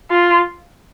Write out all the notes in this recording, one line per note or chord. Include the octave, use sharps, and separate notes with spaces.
F4